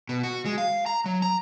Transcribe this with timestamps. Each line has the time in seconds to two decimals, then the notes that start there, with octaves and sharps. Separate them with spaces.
0.09 B2
0.23 F#4
0.45 G#3
0.58 F5
0.86 A#5
1.06 F#3
1.22 A#5